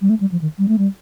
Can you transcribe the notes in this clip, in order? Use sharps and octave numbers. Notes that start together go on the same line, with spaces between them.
G3
A3
G3
F3
D#3
G3
A3
G3